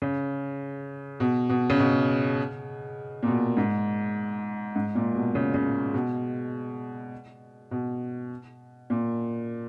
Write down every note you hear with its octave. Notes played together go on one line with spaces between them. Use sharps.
C#3
B2
B2
C#3
B2
A#2
B2
G#2
G#2
A#2
B2
C#3
C#3
B2
B2
A#2